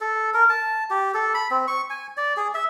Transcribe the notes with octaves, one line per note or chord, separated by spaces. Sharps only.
A4
A#4
A5
G4
A4
B5
C4
C#6
G#5
D5
G#4
E5